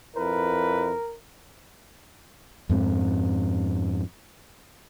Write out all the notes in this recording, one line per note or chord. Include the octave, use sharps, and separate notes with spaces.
F2 E4 A#4 B4
F2 G#2 C4